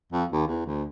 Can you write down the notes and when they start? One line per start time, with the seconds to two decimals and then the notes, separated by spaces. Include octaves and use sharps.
0.12 F2
0.32 D#2
0.47 E2
0.66 D2